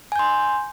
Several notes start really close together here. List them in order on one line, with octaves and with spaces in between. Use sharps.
G#5 G6 C6